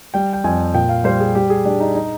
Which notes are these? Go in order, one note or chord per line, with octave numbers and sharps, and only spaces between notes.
G3 G5
G5
F2 G#5
A#2 G5
F5
G3 C5
G#4
G3 G4
G#4
G3 D4
D#4
D#4